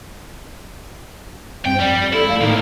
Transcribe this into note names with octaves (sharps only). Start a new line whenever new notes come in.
G2 C4 G5
F2 G3 D5
E4 A4
A3 F5
B1 A2 D#3 A#3